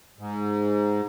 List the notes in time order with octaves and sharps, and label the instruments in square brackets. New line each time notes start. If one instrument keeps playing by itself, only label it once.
[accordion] G#2